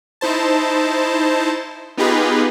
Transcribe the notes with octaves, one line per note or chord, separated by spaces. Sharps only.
D#4 E4 C5 A5
B3 D#4 F4 G4 G#4 B4